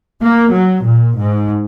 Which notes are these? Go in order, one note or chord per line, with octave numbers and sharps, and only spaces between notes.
A#3
F#3
A#2
G#2